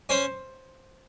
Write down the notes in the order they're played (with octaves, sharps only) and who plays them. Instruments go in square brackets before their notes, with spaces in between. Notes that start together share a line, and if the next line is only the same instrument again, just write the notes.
[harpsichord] C#4 C#5 [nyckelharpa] C5